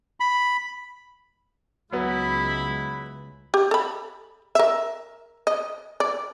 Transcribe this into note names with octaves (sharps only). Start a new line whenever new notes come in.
B5
C#2 F#3 G#3 B3 E4 B5
G4
A4 B5
A#4 E5
D#5
D5